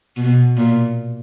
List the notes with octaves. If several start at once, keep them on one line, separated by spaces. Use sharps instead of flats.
B2
A#2